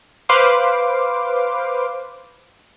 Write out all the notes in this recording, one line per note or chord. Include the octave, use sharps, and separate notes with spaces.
B4 C5 F5 C6 D6